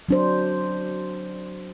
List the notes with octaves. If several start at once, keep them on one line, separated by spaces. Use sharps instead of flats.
F#3 D4 C5